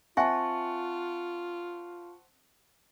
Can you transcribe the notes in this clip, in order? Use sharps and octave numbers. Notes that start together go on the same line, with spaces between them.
C4 F4 E5 F#5 G#5 A5 C#6